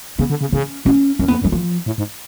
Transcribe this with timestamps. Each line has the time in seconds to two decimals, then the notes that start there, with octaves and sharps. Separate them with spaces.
0.19 C#3 B3
0.30 D3
0.41 C#3
0.52 C#3 C#4
0.85 B2 C#4
1.19 F#2 C#4
1.28 F2 B3
1.42 F#2
1.44 F#3
1.52 F3
1.86 A2
1.98 G#2